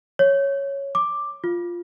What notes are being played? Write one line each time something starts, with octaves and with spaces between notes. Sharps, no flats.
C#5
D6
F4